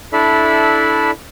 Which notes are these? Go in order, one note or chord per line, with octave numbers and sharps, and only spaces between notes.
D4 E4 A4 D5 E5 B5